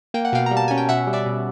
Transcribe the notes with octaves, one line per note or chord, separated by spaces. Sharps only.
A#3 G5
F#5
B2 F5 G5
G3 A#5
A5
C#4 G#5
G5
B2 E5 F#5
G3
D5 E5
B2